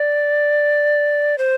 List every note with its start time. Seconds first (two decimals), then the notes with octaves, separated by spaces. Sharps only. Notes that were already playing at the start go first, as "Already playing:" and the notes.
Already playing: D5
1.38 C5